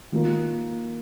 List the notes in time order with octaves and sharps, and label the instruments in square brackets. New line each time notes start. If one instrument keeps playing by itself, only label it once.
[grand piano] D#3 A#3 F4 A#4